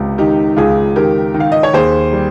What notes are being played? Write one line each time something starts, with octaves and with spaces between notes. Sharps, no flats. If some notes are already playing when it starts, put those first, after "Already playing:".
Already playing: C#2 C3
D#3 D#4 G4
C#2 F4 G#4
D#3 G4 A#4
D#3
F5
D#5
C#5
D#2 G#4 C5
G3